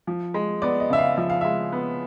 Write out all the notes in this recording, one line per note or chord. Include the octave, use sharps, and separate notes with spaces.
F3
G#3
B3 D5
D#5
C#3 E5
F5
F3 E5
F5
G#3 E5
B3